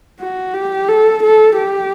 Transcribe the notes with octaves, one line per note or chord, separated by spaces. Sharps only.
F#4
G4
A4
A4
G4